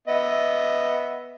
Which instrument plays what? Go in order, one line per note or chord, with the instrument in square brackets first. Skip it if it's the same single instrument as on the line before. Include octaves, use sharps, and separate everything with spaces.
[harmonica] B3 D#5 E5